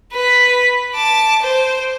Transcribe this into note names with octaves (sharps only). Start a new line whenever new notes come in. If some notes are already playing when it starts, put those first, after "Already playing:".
B4 B6
A5 D6
C5